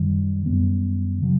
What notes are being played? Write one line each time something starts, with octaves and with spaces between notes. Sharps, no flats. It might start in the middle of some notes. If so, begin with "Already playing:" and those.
Already playing: F#2 D#3 G3
F#2 D#3 G3 B3
C#3 F#3